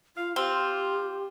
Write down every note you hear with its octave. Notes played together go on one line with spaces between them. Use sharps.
F4 F5
C4 F4 G4